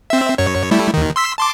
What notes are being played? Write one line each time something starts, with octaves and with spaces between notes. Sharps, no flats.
C4 E5
F#2 C#5
G3 A3 E4
D#2 D#3
C6 E6 B6
A5 C6 D6